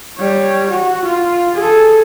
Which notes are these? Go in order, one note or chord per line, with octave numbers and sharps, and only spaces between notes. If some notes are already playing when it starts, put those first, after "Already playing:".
G3 C#5
F#4
F4
G#4 A4